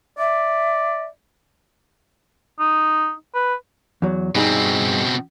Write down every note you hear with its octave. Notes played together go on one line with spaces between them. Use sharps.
D5 E5
D#4
B4
E2 F#3
G2 B2 C4 D#4 G#4